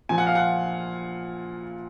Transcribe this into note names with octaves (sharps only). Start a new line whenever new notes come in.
A#2 F3 G#5
F#5
F5
F#5